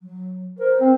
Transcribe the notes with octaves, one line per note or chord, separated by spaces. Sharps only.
F#3
A#4 C5
C4